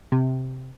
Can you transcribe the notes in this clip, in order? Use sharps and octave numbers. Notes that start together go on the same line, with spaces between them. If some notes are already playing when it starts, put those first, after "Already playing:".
C3